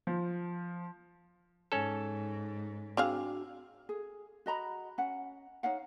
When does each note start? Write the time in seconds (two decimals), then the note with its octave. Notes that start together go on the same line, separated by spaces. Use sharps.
0.07 F3
1.72 G#2 C#4 A4
2.97 C4 D4 F#4 G#4 F5 E6
3.89 G#4
4.46 F#4 D#5 A#5 B5
4.98 C#4 F#5
5.63 D#4 C#5 F5 F#5